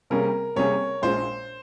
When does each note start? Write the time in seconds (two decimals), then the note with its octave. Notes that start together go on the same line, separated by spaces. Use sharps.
0.10 C3 G3 A#3 C#4 G#4 A#4
0.56 C3 G3 A#3 C#4 G#4 C#5
1.02 A#1 A#2 G#3 C#4 F4 C5